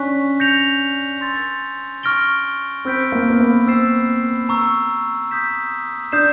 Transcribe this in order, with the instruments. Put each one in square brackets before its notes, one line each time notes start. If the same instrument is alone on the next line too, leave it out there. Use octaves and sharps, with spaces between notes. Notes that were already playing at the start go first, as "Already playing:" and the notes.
Already playing: [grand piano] C#4 D4 [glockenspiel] G#5 C#6 F#6 B6
[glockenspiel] G6 A#6 C#7 F7
C6 E6 A6
C#6 F6 A#6 D7 G7
[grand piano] C4 [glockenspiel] B5 E6 G6 B6 D7
[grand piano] A#3
B3
A#3
[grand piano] C4 [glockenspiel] C#6 E6 A6 C7 E7
[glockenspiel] A#5 C#6 E6
D#6 G6 B6 E7
[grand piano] D4 [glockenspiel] D#6 G6 C7 E7